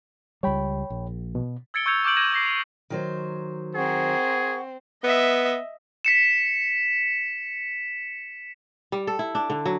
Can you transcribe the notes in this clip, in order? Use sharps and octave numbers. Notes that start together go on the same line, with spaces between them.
C#2 G3 C#5 G5 B5
A#1
B2
E6 G#6 A6 C#7 D7 G7
C#6 E6 G6 G#6 C#7 F7
C#6 D6 F6 G6 D7 F#7
D6 G6 G#6 A#6 D#7 E7
D6 A#6 C7
F7
D#3 F#3 C5
C4 G#4 A#4 F#5 C#6
B3 D#5 E5
B6 C#7 E7
G3
A4
E4
D4
D3
F#3